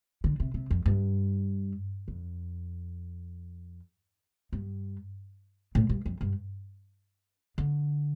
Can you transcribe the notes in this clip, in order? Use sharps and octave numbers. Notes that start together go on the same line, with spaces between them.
D3
C3
C3
F2
G2
F2
G2
A2
G2
F2
G2
D3